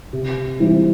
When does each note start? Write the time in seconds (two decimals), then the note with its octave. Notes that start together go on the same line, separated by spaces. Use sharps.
0.13 C3
0.60 E3 G3 C4 D#4